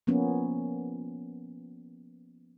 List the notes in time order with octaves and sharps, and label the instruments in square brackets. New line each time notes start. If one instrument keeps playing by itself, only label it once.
[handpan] F3 A#3 B3 C#4